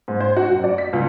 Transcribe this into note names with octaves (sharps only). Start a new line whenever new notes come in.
G#2
C5
F#4
F#2
D5
B6
C#2